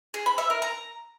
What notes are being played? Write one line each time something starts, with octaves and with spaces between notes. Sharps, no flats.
G#4
B5
E5
A#4
A#5